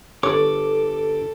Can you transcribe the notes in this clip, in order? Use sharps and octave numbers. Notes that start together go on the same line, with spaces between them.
G1 A4 C#5 D5 D6